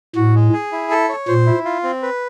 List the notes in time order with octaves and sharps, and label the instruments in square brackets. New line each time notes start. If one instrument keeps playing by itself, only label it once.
[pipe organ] A2 [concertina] F#4
[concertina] G#3
G#4
E4
A4
C#5
[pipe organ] A#2 [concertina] C5
[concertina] E4
F4
C4
B4